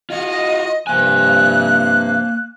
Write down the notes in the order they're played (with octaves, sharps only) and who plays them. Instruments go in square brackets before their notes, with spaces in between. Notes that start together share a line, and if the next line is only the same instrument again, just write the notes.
[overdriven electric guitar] F4 F#4 [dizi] D#5
[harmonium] G2 C3 F3 [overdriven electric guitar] A#3 G#5 [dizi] F#6